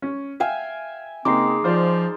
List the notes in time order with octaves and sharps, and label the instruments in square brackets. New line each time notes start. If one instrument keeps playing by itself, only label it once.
[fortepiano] C#4
[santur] E5 G5 G#5 [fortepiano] F5
[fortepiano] C#3 A#3 [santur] G#3 D#4 [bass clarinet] C4 [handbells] D6 C7
[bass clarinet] F3 [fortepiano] F4 C5 D5